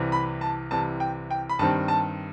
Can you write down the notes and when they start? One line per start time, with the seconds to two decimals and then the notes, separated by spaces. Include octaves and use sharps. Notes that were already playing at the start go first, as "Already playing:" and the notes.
Already playing: C2 C3 E3
0.12 B5
0.41 A5
0.71 C2 C3 E3 A5
1.00 G5
1.31 G5
1.49 B5
1.59 G2 D#3 G3 C4 A5
1.88 A5